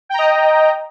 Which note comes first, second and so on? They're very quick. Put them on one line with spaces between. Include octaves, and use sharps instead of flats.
G5 A#5 D#5